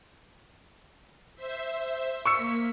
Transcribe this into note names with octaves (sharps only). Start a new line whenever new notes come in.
C5 E5
A#3 C#6 E6 B6 C#7